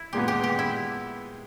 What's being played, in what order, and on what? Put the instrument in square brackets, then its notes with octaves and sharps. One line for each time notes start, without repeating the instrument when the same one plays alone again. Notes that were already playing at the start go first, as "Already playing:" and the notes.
Already playing: [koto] E4
[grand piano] A#2 G#3 B3 [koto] G4
[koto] G4
G4
E4